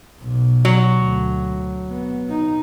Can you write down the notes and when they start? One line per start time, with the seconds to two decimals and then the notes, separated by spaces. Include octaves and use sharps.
0.22 B1
0.65 F#3
1.01 D2
1.90 B3
2.29 D#4